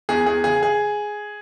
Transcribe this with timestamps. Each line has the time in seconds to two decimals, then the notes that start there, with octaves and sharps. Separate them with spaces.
0.09 E2 G#4
0.26 E2 G#4
0.44 C#3 G#4
0.63 G#4